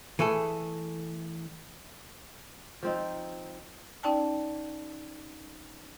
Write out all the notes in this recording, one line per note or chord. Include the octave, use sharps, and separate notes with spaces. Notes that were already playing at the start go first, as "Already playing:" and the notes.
E3 A3 G#4 A4
F3 C4 D#4
C#4 D#4 D5 G5 A5